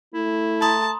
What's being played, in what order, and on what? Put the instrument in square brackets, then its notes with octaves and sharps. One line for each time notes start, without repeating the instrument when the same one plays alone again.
[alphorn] A3 [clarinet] E4
[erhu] A5 [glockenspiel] A#5 C6 D#6